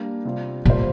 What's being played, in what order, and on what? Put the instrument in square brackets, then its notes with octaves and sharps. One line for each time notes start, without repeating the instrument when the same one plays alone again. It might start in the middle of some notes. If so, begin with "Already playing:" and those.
Already playing: [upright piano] G3 A#3 D4
C3 G3 C4 F4
[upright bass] A#2 [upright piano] G3 A#3 F4 C5